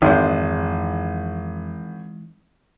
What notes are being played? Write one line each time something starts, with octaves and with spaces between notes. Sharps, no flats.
G#1 F2 D#3 E3 G#3 C5